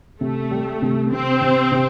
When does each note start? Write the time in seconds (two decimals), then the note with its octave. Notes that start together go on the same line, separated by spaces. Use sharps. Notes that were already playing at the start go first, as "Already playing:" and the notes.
0.21 C3 A3
0.51 G3
0.82 C3
1.12 C3 C4
1.41 C3
1.72 C3